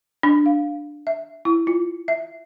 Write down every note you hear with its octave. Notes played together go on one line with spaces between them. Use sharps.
D4
F5
E5
E4
F4
E5